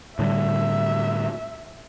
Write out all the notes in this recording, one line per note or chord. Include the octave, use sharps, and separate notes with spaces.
A2 D3 G3 E5